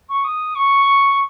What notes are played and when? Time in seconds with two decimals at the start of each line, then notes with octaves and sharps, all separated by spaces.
0.09 C#6
0.24 D#6
0.55 C#6